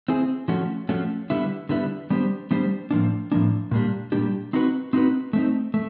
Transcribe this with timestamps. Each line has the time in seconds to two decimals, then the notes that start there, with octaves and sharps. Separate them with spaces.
0.08 C4 E4 G#4
0.48 F3 A3 C#4 F#4
0.89 F3 A3 C#4 F#4
1.30 D3 G3 B3 E4
1.69 D3 G3 B3 E4
2.10 G3 B3 D4 G4 C5
2.51 G3 B3 D4 G4 C5
2.91 A2 F3 A#3 D4
3.32 A2 F3 A#3 D4
3.71 A#2 G3 A#3 D4 G4
4.12 A#2 G3 A#3 D4 G4
4.53 C4 D#4 F#4 B4
4.93 C4 D#4 F#4 B4
5.33 A3 C4 D#4
5.74 A3